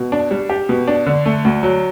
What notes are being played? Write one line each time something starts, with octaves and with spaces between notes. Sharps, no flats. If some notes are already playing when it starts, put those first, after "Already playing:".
Already playing: B2
D4
G3
G4
B2
D4
D3
A3
D2
F#3